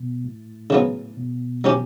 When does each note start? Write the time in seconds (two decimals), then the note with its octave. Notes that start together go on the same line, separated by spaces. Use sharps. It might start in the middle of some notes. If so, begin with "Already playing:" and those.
Already playing: B2
0.25 A2
0.70 C#3 F#3 B3
1.17 B2
1.64 F#3 C#4 G4